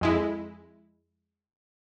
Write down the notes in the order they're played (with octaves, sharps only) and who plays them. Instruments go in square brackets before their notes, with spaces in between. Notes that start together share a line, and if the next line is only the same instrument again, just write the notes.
[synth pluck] F2 G#3 E4